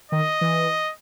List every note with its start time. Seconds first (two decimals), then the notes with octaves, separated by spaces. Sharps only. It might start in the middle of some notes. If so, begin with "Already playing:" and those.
0.11 D#3 D#5
0.41 E3